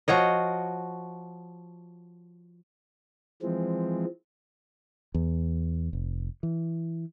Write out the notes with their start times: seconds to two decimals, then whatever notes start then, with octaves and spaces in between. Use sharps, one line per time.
0.08 F3 F#4 C#5 D#5
3.42 E3 F3 G#3 C4
5.14 E2
5.93 F1
6.43 E3